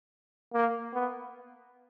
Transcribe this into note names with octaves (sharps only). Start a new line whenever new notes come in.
A#3
B3